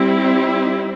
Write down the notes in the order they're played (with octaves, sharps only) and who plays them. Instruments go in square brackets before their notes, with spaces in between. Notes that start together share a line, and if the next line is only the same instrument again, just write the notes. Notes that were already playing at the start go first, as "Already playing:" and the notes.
Already playing: [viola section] G3 C4 E4